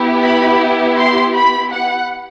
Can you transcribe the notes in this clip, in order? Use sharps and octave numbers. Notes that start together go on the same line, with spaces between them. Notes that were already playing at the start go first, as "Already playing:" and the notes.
Already playing: B3 E4 G4
B5
C6
B5
F#5